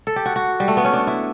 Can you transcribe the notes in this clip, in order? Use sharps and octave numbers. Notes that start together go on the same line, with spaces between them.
A4
G4
F#4
F#4
G3
A3
B3
C#4
D4
E4